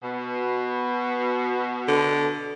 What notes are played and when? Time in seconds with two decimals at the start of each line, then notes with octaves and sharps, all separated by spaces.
0.03 B2
1.88 D3